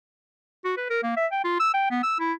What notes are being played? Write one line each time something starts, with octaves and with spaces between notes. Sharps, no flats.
F#4
B4
A#4
A#3
E5
G5
F4
E6
G5
B3
E6
E4